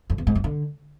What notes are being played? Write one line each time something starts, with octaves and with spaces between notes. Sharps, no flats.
F2
E2
G#2
G2
D3